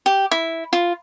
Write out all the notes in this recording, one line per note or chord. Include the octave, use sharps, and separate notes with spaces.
G4
E4
F4